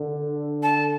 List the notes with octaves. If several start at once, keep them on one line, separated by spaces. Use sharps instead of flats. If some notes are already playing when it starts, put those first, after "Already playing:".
Already playing: D3
A5